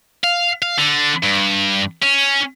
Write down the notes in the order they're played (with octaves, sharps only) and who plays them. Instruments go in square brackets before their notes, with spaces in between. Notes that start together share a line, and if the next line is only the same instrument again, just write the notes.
[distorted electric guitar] F5
F5
D3
G2
C#4